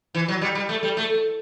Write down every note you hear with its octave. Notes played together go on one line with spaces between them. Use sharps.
E3
F#3
G3
G3
A3
G3
A3